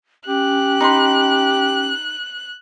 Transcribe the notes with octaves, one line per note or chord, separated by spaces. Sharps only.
C#4 G4 F#6
D#4 B5 C6